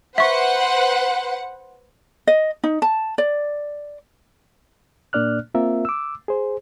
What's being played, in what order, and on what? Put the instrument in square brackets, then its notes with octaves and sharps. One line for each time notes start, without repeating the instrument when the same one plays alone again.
[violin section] B4 C5 [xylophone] E5 C#6 [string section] F#5
[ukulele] D#5
D#4
A5
D5
[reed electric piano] A#2 A#3 D4 D5 F6 F#6
A#3 C4 F4 A#4 E5
D6 E6
G#4 C5